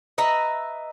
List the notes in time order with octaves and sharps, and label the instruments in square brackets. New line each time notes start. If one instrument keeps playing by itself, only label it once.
[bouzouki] B4 D#5 E5 A#5